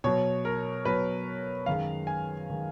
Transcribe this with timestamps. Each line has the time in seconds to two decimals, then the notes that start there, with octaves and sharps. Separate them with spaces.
0.04 B2 F#3 C#5
0.45 A#4
0.85 B2 F#3 B4
1.66 F#2 D#3 G#3 F5
2.07 G#5
2.50 D#3 G#3